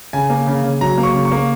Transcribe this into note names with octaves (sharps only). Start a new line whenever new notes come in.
C#3 G#5
A#3
C#3
C#3
F#3 A#5
A#3
C#6
C#3
C#6
A#3